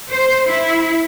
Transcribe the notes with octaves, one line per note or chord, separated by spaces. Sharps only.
C5
E4